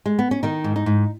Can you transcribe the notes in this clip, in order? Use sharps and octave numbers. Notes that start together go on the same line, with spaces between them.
G#3
B3
C#4
D#3 D#4
G#2
D#4
G#2